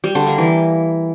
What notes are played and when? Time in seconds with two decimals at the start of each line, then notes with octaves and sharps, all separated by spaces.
0.04 G3
0.15 D3
0.27 A#3
0.38 E3